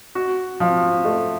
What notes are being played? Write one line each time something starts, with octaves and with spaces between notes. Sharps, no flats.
F#4
F3
A3